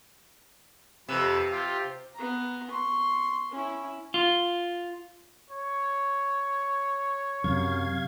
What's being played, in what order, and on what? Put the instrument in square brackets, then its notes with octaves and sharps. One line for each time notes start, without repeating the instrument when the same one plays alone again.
[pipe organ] F2 B4 E6 [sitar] C3
[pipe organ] F4 G4
[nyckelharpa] B3 A#5
C6 C#6
C#4 E4
[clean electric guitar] F4
[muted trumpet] C#5
[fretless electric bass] F#2 [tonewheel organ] C3 F5 G#6